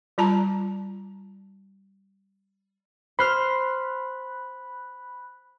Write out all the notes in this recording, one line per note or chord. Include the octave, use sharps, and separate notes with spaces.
G3 F4 A5 A#5
C5 B5 C6 F6 F#6